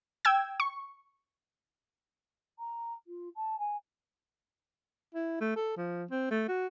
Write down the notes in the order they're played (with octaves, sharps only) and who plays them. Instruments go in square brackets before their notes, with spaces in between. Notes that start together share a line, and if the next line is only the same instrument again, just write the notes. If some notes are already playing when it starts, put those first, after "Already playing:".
[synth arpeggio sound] G5 E6 G#6
C#6
[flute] A#5
F4
A5
G#5
[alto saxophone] E4
A3
A4
F3
C4
A3
F#4